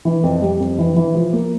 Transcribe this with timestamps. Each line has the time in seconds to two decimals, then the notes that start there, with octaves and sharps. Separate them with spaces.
0.05 E3
0.24 F2
0.42 G3
0.60 F2
0.78 E3
0.96 E3
1.15 F3
1.33 A#3